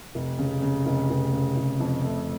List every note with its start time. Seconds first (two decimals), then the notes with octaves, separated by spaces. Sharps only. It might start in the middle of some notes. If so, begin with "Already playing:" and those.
0.15 F1
0.39 C#3
0.62 C#3
0.86 F1
1.10 F1
1.33 C#3
1.57 F1
1.80 F2
2.04 A3